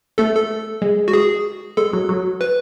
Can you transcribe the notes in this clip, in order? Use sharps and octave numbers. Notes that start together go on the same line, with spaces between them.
A3 A4
A4
G#3
F#4
G#4
G#3 A4
F#3
F#3
B4